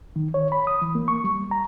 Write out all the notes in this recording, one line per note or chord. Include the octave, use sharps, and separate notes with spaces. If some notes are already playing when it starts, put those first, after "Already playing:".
D#3
C#5
B5
D#6
E3
A#3
C#6
G3
A#5